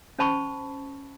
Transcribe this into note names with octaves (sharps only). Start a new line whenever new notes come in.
C#4 C5 A5 B5 C#6